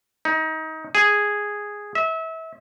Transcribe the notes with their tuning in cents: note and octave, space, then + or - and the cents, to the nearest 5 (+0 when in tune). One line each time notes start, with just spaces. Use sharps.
D#4 +25
G#4 -5
E5 -30